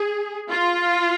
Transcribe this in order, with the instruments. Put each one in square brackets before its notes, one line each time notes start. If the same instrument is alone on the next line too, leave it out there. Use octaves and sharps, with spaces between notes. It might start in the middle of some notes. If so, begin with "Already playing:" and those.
Already playing: [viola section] G#4
F4